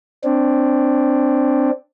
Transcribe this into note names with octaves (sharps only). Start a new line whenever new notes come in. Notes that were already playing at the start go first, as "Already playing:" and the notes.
C4 D4